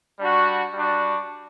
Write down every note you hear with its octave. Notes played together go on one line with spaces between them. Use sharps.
G3 D4 F#4
G3 D4 F#4